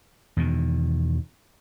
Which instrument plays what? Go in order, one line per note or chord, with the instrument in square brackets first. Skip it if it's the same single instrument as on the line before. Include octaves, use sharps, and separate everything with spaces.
[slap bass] E2 B2 D#3